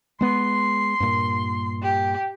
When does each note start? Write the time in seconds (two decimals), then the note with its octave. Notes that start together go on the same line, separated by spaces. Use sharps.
0.21 G#3 B3 C6
1.00 G2 A#2
1.82 G4